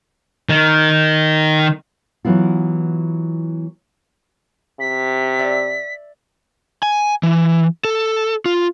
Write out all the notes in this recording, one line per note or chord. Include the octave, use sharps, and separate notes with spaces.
D#3
E3 F#3 B3 E4 F4
C3 B6
D5 E5
G#5
E3
A4
F4